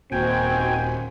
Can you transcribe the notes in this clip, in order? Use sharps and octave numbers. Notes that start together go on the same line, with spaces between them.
D#1 A#2 D#3 C4 F#4 G5 G#5